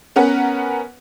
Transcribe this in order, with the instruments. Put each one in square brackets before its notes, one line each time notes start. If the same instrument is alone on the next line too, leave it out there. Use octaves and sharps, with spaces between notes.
[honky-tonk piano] B3 C#4 A#4 B4 F#5